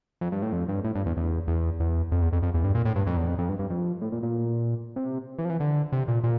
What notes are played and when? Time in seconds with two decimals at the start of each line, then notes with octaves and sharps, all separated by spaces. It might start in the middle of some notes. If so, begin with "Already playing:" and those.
0.21 F2
0.32 G2
0.42 A2
0.53 F2
0.69 G2
0.84 A2
0.95 G2
1.06 E2
1.17 E2
1.48 E2
1.80 E2
2.12 F2
2.22 E2
2.32 F2
2.43 F2
2.54 E2
2.64 G2
2.75 A#2
2.85 A2
2.96 G2
3.07 F2
3.17 E2
3.27 F2
3.39 F2
3.49 G2
3.59 G2
3.70 F2
4.02 A2
4.12 A#2
4.23 A#2
4.96 C3
5.38 E3
5.45 F3
5.50 E3
5.60 D3
5.92 C3
6.08 A#2
6.23 A#2